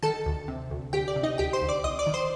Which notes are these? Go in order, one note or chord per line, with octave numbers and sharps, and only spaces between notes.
D#3 A4 A5
D2
C3
D2
D2 G4 G5
D5
C3
D#4 D#5
D2 G4 G5
C5 C6
D2
D5 D6
C2 D#5 D#6
D5 D6
D#3
C5 C6